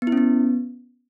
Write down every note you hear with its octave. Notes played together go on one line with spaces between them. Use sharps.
B3
E4
C#4
B3